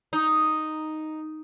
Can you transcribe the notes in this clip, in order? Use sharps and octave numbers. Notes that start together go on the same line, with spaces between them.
D#4